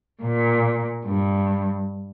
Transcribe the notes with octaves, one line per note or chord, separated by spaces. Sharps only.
A#2
G2